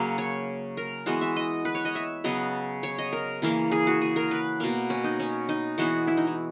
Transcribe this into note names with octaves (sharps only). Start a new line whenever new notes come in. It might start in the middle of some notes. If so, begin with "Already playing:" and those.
Already playing: C#3 F#3 A#3
C#5
A#4
E3 G#3 B3 F#4
E5
D#5
B4
C#5
D#5
E5
C#3 F#3 B3 D#5
C#5
D#5
A#4
C#3 E3 A#3
G#4
F#4
G#4
A#4
B4
B2 A#3
C#4
D#4
C#4
D#4
E3 G#3 B3 F#4
E4
D#4
E4